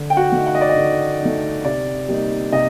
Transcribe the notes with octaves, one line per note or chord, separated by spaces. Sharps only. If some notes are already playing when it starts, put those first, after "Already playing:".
Already playing: D3
G5
F#4 F#5
A3 D#4
F#5
D#5
D5
D#5
D3
D#4
A3
C3 D5
G3 A#3 D#4
C3 D#5